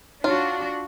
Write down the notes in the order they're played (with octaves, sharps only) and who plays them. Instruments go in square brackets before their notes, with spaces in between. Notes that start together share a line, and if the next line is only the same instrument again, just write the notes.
[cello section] D4 F#4 [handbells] D#4 C#5 [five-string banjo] F4